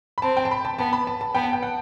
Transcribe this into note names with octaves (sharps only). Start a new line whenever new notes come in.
B5
C4 A5
G5
A5
B5
A5
B3 A5
B5
A5
A5
B3 G5
A5
G5
F#5